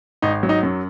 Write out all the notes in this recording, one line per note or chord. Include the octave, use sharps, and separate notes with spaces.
G#1 D#4
F#3
D#4
F#2